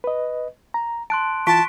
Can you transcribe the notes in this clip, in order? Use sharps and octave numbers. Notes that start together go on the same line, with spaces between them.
B4 D#5
A#5
A5 C6 F#6 D7
E3 F4 A5 C#6 B6 D7